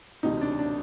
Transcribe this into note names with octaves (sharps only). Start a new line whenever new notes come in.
E1 D2 C3 D#4
D4
D4